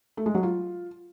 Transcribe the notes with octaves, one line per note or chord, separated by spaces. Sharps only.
A3
G#3
F#3
F4